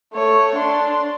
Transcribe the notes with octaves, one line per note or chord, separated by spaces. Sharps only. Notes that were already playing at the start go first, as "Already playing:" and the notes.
A3 C#5
D4 C6